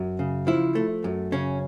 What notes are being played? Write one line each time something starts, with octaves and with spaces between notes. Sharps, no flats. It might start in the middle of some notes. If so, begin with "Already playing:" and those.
Already playing: F#2
C#3
F3 E4
A3
F#2
C#3 C#4